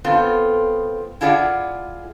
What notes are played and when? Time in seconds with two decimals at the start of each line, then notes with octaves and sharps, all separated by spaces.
0.04 B3 C4 F4 A4
1.21 E4 F4 G#4 D5 E5 F#5